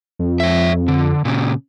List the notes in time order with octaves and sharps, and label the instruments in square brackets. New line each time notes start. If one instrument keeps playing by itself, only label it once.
[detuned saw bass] F2
[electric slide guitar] C#5 E5
D3
A#2 C#3